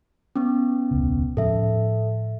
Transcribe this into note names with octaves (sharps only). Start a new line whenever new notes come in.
B3 C#4
E1 C#2 C#3
A2 F3 C#4 A4 E5